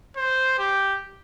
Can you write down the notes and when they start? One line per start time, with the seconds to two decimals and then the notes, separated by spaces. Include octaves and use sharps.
0.17 C5
0.59 G4